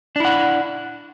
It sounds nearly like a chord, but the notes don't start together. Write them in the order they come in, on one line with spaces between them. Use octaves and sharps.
D4 E4 F#5